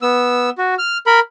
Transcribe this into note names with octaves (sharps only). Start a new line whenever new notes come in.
B3 E6
F#4
F6
A#4 B5